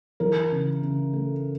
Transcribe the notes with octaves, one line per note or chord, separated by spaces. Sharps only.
E3 A#4
C#3
C#3
A3